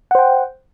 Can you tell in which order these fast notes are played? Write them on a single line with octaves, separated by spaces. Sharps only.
F#5 C5 G5